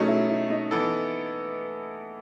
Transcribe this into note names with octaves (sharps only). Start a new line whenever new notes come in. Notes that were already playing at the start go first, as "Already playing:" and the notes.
Already playing: B2 F#3 A3 C#4 D#4 G#4
E4
E4
D#4
E3 B3 E4 A4